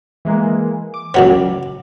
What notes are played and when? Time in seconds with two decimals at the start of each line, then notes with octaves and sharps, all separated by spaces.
0.25 E3 G#3 A#3
0.94 D6
1.14 C#2 F#3 B3